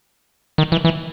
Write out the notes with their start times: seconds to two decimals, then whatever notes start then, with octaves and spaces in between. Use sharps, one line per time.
0.58 D#3
0.72 E3
0.85 E3